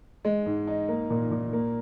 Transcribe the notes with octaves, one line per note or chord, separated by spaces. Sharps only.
G#3
G#2
D#4
A#3
A#2
A#2
A#3